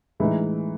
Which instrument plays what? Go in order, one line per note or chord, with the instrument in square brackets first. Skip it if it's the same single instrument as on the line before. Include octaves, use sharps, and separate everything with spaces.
[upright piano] A2 E3 G#3 D#4